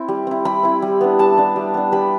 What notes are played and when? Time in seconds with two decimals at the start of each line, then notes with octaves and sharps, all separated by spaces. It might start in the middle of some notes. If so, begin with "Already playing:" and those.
Already playing: C4 E4
0.08 G3
0.27 C4 E4
0.45 G3 B5
0.63 C4 E4
0.82 G3
1.01 B3 D4
1.19 G3 A5
1.37 B3 D4
1.56 G3
1.74 B3 D4
1.92 G3 B5